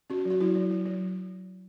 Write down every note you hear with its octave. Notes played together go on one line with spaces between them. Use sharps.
C#4 F#4
F#3
F#4
F#3 E4
F#3
F#3
F#3